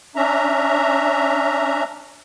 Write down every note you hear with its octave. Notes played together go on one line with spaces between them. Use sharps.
C#4 D4 E5 A#5